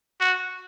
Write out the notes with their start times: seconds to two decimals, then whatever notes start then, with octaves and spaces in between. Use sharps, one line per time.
0.20 F#4